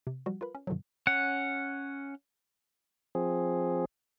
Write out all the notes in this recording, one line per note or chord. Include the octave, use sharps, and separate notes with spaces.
C3
F3 G3 F#4
F4 A#4 B4 B5
C#4
G2 B2 D3 D#3 F3 F#3
C#4 F#5
F3 C4 G#4